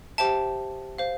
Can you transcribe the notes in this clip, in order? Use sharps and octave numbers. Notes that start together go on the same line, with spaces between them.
G4 C5 E5 G5 A5
C5 F5